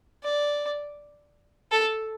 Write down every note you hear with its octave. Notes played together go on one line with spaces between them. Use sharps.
D5
A4